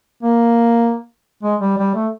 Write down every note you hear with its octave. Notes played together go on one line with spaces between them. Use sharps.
A#3
G#3
G3
G3
A3